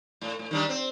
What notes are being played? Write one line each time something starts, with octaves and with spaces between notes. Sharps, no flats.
A2
A2
D#3 G3 D4
C4